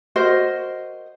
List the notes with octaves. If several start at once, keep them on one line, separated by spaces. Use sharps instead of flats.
F#4 A#4 C5 D#5